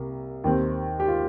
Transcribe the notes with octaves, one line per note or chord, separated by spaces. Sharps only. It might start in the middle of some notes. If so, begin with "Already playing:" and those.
Already playing: C2 G3 A#3
D#2 D#3 C4
G4
F4